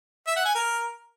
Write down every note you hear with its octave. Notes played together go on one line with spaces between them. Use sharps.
E5
F#5
G#5
A#4